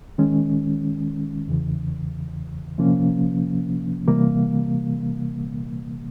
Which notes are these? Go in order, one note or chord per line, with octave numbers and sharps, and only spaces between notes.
D#3 G#3 C#4
E2 C#3 E3
C3 F3 A#3 C#4
C3 E3 G3 A#3